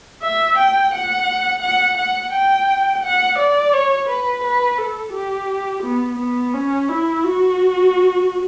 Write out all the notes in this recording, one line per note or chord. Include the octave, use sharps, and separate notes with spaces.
E5
G5
F#5
F#5
F#5
G5
F#5
D5
C#5
B4
B4
A4
G4
B3
B3
C#4
E4
F#4